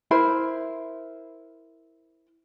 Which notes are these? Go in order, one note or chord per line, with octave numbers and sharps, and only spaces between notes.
E4 A#4 C5 B5